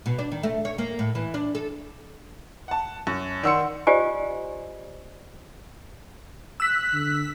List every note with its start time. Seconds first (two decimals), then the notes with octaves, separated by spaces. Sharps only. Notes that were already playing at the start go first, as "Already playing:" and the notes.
0.06 B2
0.19 D4
0.32 D#3
0.43 A3
0.65 C#5
0.78 A#3
0.99 A2
1.15 E3
1.34 D4
1.55 A4
2.68 F#5 A5
3.07 F#2
3.43 D#3 D5 F#5 C6 E6 C#7
3.87 F4 G4 C5 D5 D#5 G#5
6.60 E6 F#6 B6
6.94 D3